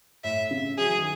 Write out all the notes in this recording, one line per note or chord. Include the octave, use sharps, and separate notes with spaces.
A2 E5
C#3
F#3 G#4
E3
D#3